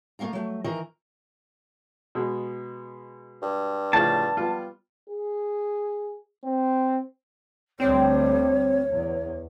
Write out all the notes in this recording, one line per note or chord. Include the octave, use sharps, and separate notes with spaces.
A3 A#3 C#4 F5 A#5
F#3 A3
D#3 E3 A#4 A#5
B2 G#3
G2
A2 C#3 F3 A5
G3 B3 F4
G#4
C4
D2 G3 A3 C4 C#5
E2